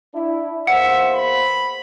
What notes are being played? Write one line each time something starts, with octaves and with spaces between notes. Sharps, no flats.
D4 E4
E2 A#3 C5 E5 F#5
B5